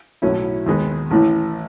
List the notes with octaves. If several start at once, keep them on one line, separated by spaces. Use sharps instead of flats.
B1 A2 F#3 C#4 E4
D#2 D#3 G#3 B3
A1 A2 E3